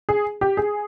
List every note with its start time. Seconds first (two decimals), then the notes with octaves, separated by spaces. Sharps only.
0.09 G#4
0.41 G4
0.57 G#4